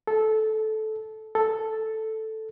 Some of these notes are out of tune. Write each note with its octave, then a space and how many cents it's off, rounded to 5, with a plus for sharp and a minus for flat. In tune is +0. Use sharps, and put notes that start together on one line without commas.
A4 -15
A4 +0